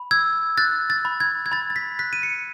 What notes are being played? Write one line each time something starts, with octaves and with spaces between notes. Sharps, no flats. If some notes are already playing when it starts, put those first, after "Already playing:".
Already playing: B5
E6 G#6
F#6 A6
A6
B5
G#6
G#6
B5 A6
A6
B6
F#6 B6
D#7
C#7